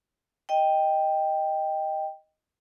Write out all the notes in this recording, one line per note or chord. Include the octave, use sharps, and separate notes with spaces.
D#5 G5